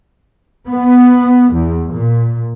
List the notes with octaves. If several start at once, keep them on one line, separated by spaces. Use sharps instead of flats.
B3
E2
A#2